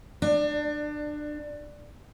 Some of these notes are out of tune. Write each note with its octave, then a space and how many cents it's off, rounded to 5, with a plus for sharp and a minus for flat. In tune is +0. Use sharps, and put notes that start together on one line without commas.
D4 +25